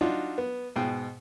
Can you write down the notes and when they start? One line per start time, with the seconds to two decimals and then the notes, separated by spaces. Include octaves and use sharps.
0.01 D4 D#4 F4 F#4
0.38 B3
0.76 G#2 B2 G5